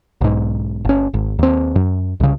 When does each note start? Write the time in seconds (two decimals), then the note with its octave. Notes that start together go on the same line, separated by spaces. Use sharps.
0.21 B1 G#2
0.85 G1 C#4
1.14 G#1
1.39 D#2 C4
1.76 F#2
2.20 C2 C#3